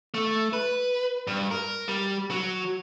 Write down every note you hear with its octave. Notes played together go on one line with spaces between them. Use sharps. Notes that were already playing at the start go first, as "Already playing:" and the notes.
A3
B4
G2
A#4
G3
F#3